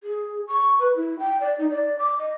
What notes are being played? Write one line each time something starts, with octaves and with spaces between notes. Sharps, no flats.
G#4
C#6
B4
E4
G5
D5
D#4
D5
D6
D#5